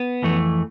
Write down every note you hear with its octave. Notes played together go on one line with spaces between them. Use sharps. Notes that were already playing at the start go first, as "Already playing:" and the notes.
Already playing: B3
F2 E3 A3